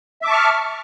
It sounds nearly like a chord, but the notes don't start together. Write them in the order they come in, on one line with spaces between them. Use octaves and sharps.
E5 D6 A5 C#6 F6